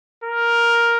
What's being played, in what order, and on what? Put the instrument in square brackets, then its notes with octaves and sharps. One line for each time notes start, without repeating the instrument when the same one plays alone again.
[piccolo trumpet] A#4